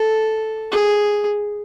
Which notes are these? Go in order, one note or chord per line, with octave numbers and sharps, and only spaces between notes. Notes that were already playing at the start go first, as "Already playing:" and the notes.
Already playing: A4
G#4